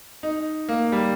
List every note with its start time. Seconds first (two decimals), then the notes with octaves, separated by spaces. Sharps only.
0.23 D#4
0.69 A#3
0.92 G3